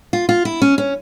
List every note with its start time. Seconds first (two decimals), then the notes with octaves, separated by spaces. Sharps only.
0.13 F4
0.29 F4
0.45 E4
0.62 C#4
0.78 C#4